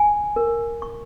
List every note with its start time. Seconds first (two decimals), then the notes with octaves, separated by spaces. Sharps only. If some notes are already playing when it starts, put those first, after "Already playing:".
Already playing: G#5
0.36 A#4
0.82 C#6